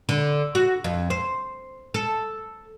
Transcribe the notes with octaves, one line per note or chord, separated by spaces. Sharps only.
D3
F#4
F2
C5
A4